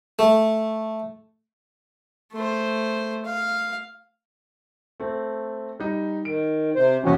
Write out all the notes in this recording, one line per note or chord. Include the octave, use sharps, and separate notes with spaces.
A3
A3 C5
F5
A3 C4
G3 D#4
D#3 D7
C3 C5
D#2 E3 C#4 F#4 G4